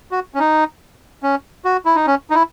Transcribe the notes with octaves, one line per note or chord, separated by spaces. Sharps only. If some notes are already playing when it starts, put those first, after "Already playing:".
F#4
C#4
D#4
C#4
F#4
E4
D#4
C#4
D#4
E4